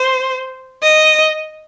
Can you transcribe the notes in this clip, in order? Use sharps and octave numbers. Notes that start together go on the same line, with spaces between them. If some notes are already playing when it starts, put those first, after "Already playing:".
Already playing: C5
D#5